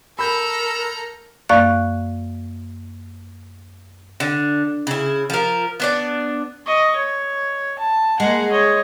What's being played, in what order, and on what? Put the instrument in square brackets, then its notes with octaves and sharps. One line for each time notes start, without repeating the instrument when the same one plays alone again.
[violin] A4 A#5 [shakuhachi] A#4 [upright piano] B5 G6 [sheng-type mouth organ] E6
[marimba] F#2 A#3 D5 F5 C#6 F#6
[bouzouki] D3
C#3 E4
F3 A#4
B3 D4 D5
[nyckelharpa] D#5 C#6
C#5
A5
[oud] G#3 [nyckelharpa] A#3 F#5
[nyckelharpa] C#5 D#5